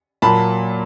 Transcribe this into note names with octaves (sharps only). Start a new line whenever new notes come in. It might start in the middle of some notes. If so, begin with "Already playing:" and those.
A#2 F#3 A#3 A5 B5